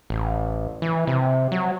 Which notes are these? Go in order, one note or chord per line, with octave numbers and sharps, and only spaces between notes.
A1
E3
C3
F#3